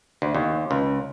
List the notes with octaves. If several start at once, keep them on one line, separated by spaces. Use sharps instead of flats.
D2
D#2
C#2